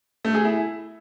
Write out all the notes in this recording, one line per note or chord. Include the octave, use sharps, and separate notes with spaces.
A3
G#4
E4